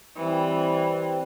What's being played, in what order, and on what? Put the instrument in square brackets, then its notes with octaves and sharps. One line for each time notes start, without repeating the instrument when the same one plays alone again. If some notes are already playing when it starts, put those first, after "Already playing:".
[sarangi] E3 [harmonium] G3 C4